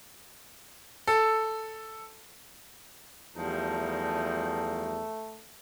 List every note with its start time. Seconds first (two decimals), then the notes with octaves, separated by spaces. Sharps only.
1.07 A4
3.37 E2 F3 G3 A3 D#4